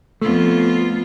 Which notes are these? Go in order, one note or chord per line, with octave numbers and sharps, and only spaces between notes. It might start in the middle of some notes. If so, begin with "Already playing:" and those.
F2 A3 B3 F4